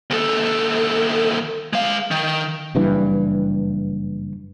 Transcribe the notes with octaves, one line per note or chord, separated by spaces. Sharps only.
D#2 A4
G#3 F5
D#3
F#1 G2 E3